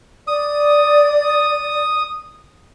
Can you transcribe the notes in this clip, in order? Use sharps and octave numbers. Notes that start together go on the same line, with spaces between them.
D5 D#6